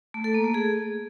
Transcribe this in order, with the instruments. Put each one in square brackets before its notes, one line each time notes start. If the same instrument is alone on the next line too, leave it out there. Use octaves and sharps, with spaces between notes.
[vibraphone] A3
A4
A#3
A3
G#4